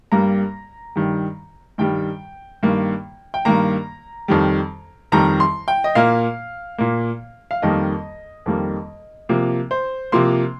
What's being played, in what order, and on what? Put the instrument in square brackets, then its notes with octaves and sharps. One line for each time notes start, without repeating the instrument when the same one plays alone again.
[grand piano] G2 G3 A#3 A#5
G2 D#3 G3
G2 D#3 G3 G5
G2 D#3 A#3
G5
G2 D#3 A#3 A#5
F2 D#3 G3
F2 D#3 G3 A#5
C6
G5
D#5
A#2 A#3 F5
A#2 A#3
F5
F2 D#3 G3 A#3 D#5
F2 D#3 G3 A#3
C3 F3 A#3
C5
C3 F3 A#3 C6